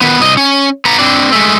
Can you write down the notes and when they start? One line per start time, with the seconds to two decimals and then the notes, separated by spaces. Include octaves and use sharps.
0.01 D#3 B3
0.20 C2 D#5
0.37 C#4
0.85 B3 A#5
0.99 C4 D4
1.32 G#3 A3